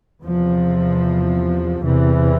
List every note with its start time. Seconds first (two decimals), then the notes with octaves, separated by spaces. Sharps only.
0.23 E2 C3 F3
1.82 E2 C3 E3